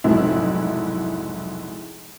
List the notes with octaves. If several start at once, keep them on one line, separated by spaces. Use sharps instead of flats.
F1 B1 G#2 E4